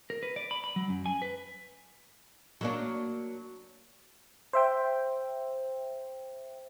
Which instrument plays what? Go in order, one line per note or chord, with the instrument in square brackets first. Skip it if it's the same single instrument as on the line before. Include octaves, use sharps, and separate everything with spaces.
[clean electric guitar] A#4
B4
D5
B5
B5
F#3
F#2
G#5
B4
[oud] F#3 A#3 D4
[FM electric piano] C5 E5 G5